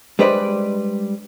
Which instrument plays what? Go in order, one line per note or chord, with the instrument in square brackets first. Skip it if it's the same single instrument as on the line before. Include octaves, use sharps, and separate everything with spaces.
[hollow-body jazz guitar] G3 G#3 D4 B4 C5 D5